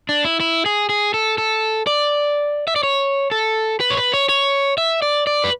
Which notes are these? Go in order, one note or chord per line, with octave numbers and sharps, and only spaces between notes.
D4
E4
E4
G#4
G#4
A4
A4
D5
E5
D5
C#5
A4
B4
C#5
B4
C#5
C#5
E5
D5
D5
B4